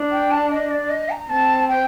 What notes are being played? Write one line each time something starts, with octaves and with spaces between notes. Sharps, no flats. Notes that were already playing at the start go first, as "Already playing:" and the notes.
Already playing: D4
G5
A5
D#5
D5
D#5
A#5
C4 A5
G5